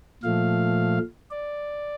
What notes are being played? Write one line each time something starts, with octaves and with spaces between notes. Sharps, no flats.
A#2 F3 A3 F5
D5